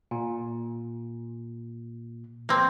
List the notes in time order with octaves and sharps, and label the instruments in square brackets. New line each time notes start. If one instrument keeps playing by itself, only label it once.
[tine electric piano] A#2
[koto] A#3 C4